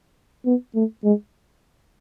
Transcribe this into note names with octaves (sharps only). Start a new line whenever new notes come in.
B3
A3
G#3